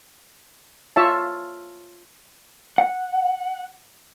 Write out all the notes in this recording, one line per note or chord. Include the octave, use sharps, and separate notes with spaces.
F4 C#5 E5 A5
F#5